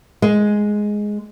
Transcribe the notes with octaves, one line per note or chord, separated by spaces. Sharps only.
G#3